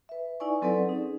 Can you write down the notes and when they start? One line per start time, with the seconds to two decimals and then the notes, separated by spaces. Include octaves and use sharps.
0.09 B4 E5
0.40 D#4 E4 B4 D5 G#5 C#6
0.62 F#3 C4 A4 B4 D5 F#5
0.87 C#4 D#4 G#4